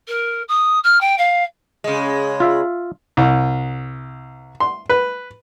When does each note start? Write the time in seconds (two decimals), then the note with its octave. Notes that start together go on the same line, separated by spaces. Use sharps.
0.08 A#4
0.49 D#6
0.84 F6
1.01 G5
1.18 F5
1.84 C#3 G#3
2.40 F4 E5 F5
3.17 C2
4.60 C6
4.89 B4